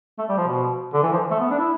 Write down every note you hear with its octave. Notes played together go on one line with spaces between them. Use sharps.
A3
G3
F3
B2
D3
E3
F3
A3
B3
D4
E4